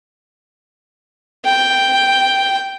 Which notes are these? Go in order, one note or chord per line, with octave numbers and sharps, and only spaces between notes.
G5